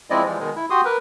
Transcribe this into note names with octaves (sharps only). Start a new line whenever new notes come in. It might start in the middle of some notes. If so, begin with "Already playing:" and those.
F3 G#3 C4 E4 D5 D#5
E3 F3 G3 G#3
B2 D#3 G#3
E4
F#4 G4 C6 D#6
A#4 B4